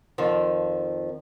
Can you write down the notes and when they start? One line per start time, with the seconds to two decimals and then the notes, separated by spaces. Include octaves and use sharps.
0.18 F2 D#3 F3